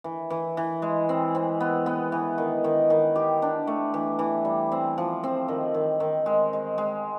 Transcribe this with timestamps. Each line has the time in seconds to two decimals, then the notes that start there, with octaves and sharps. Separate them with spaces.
0.04 E3
0.30 E3
0.57 E3
0.82 G#3
1.09 C4
1.35 C4
1.60 B3
1.86 B3
2.12 E3
2.38 D#3
2.64 D#3
2.90 D#3
3.16 G4
3.42 D4
3.67 A3
3.94 E3
4.19 E3
4.45 G3
4.72 C4
4.98 F3
5.24 C4
5.48 D#3
5.74 D#3
6.00 D#3
6.26 G#3
6.53 G#3
6.78 G#3